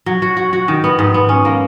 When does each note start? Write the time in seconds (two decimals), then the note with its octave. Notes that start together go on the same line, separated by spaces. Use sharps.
0.06 F#3
0.22 F#4
0.37 F#4
0.53 F#4
0.68 D#3
0.84 B3
0.99 G#2
1.14 B3
1.29 C#4
1.45 A#3